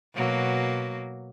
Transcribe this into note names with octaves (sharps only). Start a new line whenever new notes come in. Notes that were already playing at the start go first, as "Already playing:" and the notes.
B2 F#3 A#3